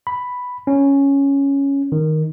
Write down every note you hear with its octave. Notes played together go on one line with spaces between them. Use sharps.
B5
C#4
D#3